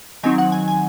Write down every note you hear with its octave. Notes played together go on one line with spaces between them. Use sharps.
D#3 F#3 C4 D#4 G#5
F#5
G#5
G#5